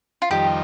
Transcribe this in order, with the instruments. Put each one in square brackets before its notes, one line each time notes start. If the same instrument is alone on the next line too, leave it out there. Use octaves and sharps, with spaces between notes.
[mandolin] F4
[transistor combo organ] F2 D#3 G3 [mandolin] G4